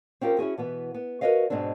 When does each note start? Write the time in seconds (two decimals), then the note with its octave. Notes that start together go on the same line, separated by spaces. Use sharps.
0.21 C4 C#4 F4 G4 A#4
0.39 C#4 E4 F#4 G#4
0.58 B2 E3 B3
0.94 B3
1.21 F#4 A#4 B4 C#5 D#5 F5
1.50 G#2 B2 G#3 C4 D4